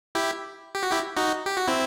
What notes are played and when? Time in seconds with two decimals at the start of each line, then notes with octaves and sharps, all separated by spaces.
0.15 E4 G4
0.75 G4
0.83 F#4
0.92 E4 G4
1.17 D#4 F#4
1.46 G4
1.57 F#4
1.68 C4 E4